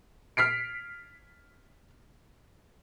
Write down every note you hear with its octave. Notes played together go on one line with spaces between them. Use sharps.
F6 B6 C7 D7